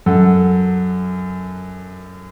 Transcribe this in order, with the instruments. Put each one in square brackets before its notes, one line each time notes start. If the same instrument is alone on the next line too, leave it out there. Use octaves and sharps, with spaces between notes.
[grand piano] F#2 A4 F#5